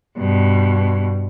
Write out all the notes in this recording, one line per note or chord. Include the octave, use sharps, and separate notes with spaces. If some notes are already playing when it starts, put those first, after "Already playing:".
G2 B2